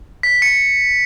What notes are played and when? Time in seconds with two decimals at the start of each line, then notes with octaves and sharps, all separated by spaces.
0.23 B6
0.42 C#7